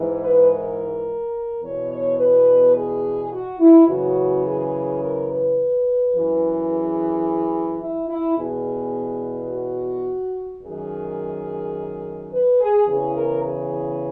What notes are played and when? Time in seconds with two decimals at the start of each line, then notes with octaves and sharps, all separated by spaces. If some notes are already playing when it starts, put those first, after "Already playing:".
Already playing: G#2 E3
0.21 B4
0.49 A#4
1.62 E2 B2 C#5
1.90 C#5
2.18 B4
2.75 G#4
3.31 F#4
3.59 E4
3.87 F#2 C#3 E3 F#4
4.44 G#4
5.00 A#4
5.28 B4
6.13 F#2 E3
6.68 G#4
7.81 E4
8.09 E4
8.37 E2 B2 G#4
9.50 F#4
10.62 F#2 D#3 G#4
12.31 B4
12.60 G#4
12.87 E2 C#3 E3 G#4
13.15 A#4
13.43 G#4